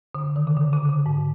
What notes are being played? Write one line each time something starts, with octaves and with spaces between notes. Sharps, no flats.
D3
D#3
C#3
D3
C#3
D3
G#2